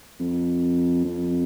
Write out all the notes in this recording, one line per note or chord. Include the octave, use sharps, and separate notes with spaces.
F2
F2